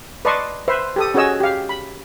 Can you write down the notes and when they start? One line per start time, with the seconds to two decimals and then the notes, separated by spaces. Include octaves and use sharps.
0.25 B4 D5 D#5 A5 C6 C#6
0.68 B4 C5 E5 C6
0.96 G4 A4 D#6
1.14 C#4 F#4 G#4 C#5 D#5 E6
1.40 G4 F5
1.69 B5